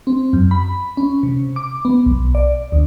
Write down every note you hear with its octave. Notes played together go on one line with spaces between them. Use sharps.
C4
F#2
B5
C#4
C3
D6
B3
B1
D5
D2